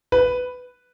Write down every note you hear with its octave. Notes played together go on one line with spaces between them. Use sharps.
B4